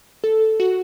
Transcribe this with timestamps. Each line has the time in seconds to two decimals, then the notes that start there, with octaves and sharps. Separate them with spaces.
0.24 A4
0.60 F#4